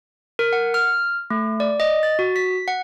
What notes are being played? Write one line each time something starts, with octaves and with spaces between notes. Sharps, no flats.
A#4
F#5
F6
A3
D5
D#5
A6
F#4
B6
F#5